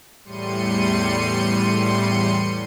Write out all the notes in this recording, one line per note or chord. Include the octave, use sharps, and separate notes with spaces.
E2 A2 G3 C6 C#7 D#7